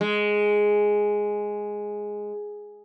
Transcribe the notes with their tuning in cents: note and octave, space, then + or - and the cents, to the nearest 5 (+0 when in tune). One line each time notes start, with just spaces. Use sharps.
G#3 +0